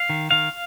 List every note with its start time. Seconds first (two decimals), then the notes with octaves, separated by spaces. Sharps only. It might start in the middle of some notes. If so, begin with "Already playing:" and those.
Already playing: F5
0.09 D#3
0.31 D#3 F5